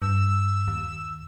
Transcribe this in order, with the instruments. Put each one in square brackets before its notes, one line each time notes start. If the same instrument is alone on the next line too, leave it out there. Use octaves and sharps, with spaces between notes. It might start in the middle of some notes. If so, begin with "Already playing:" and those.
[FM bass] G2 [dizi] E6
[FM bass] D#2